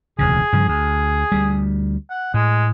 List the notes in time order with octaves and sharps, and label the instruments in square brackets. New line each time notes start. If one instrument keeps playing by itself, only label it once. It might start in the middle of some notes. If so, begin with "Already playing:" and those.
[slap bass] E1 D2 C#3 [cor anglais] G#4
[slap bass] G2 C#3 F3
[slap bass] D2 [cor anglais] G#4
[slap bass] D2 G3
[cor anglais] F#5
[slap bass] A2 [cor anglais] G#3